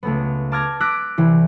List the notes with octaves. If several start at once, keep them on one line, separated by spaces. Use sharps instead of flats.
C#2 A3 B3
A5 D6 F6 G#6 A#6
D6 E6 F#6 A#6 B6 D7
C2 E3